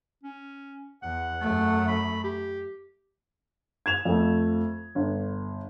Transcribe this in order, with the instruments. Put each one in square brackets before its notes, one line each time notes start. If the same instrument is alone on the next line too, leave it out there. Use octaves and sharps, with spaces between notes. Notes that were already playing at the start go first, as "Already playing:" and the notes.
[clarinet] C#4
[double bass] E2 [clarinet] F#5
[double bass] F#2 A3
[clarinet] B5
G4
[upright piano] G#6 E7 F7
F2 A3
G1